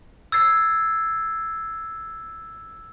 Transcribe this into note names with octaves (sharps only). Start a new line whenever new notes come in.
E6 G#6 A6 C7